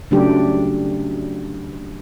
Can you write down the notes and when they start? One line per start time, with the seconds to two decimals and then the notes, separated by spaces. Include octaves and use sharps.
0.11 C#3 F#3 A3 D4 G4